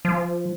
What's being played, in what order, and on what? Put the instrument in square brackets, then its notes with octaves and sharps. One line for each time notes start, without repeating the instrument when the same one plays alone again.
[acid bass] F3